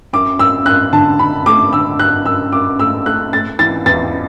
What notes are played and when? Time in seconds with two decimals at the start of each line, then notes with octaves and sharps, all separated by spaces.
0.13 F#2 D6
0.39 F#2 E6
0.66 F#2 F#6
0.93 D3 A5
1.19 D3 B5
1.46 A3 D6
1.73 D3 E6
1.99 F#2 F#6
2.26 F#2 E6
2.52 F#2 D6
2.79 A3 E6
3.06 A3 F#6
3.33 A3 A6
3.59 E3 A6
3.86 E2 A6